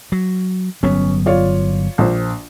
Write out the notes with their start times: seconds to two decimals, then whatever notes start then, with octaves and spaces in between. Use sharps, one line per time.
0.12 F#3
0.83 G1 F#3 B3 C#4
1.26 F4 C#5 D5
1.98 A#1 C5